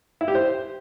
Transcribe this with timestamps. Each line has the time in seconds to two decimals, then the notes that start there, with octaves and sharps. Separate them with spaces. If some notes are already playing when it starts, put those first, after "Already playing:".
0.21 E4
0.28 G4
0.35 C5